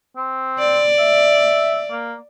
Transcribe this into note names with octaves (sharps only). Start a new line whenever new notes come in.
C4
D5
E5
A#3